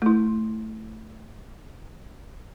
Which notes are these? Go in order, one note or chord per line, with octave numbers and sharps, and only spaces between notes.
A3 E4